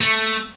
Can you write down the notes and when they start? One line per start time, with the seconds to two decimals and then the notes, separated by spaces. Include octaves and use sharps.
0.01 A3